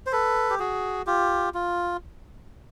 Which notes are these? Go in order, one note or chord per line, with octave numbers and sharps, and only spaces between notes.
C5
A4 B4
G4
F#4 G#4
F4 G4
F4